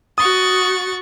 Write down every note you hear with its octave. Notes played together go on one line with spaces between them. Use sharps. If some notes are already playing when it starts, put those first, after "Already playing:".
F#4 C#6 D#6 A6